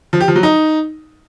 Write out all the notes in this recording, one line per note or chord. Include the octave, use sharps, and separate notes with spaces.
F3
G4
F3
F#3
D#4